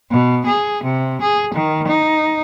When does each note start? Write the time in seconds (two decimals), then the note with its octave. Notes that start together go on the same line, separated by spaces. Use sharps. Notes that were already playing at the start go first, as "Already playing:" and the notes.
0.11 B2
0.46 G#4
0.83 C3
1.21 G#4
1.54 D#3
1.87 D#4